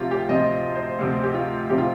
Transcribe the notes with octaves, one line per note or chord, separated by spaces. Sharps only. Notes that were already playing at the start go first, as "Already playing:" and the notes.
Already playing: D2 C3 F3 C4 F4 G4
G4
D2 C3 F3 C4 D#5
C5
D2 C3 F3 C4
G4
F4
C3 F3 C4 G4
F4